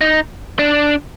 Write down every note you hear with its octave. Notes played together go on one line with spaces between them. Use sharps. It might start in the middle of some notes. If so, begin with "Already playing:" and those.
D#4
D4